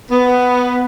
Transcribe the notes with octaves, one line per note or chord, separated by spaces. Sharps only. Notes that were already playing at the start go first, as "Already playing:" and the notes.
B3